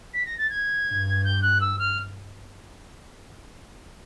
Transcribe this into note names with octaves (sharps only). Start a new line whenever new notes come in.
B6
A#6
A6
G#6
G2
G6
F#6
E6
F6